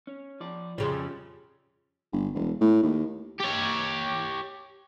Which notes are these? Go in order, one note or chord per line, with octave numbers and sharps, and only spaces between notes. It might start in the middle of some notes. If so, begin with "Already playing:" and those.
C#4
F3 D5
F2 C#3 F3 G3 G4 C6
G1
E1
A2
D#2
G4 C#5